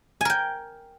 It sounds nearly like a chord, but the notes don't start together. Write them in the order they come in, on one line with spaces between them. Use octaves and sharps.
G#5 A#4 G5